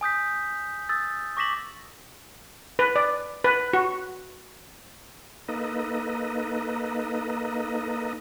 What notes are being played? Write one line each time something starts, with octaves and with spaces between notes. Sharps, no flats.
G#5 D#6 G6 B6
D#6 E6 A6
C#6 D6 A#6 B6 E7 F#7
B4
D5
B4
F#4
A#3 D#4 A4 B4 D#5